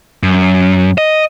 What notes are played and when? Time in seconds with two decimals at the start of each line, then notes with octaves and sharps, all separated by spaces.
0.23 F#2
0.98 D#5